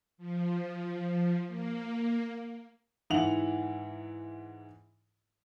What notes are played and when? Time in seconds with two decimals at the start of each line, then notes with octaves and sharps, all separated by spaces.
0.18 F3
1.47 A#3
3.10 G#2 E3 E4 F#5 F7 F#7